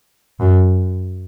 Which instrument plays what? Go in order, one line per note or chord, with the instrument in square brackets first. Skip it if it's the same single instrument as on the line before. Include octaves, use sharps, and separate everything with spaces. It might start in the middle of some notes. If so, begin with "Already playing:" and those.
[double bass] F#2